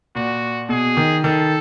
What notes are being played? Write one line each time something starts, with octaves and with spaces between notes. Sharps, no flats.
A#2 F#4
B2 G#4
D#3
D#3 A4